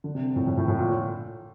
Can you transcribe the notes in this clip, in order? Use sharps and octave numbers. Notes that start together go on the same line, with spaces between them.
D3
C3
A2
A2
A2
A2
A#2